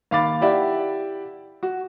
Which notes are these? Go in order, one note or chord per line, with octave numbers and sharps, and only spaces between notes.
D#2 F5 B5 D6 A6
E4 G4 D5 E5 F#5
F#4